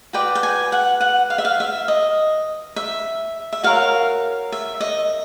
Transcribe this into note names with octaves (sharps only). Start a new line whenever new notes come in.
F#4 B4 D5 G5
G5
G#5
F#5
F#5
F5
E5
F5
E5
D#5
E5
E5
F#4 A#4 C#5 F5
E5
D#5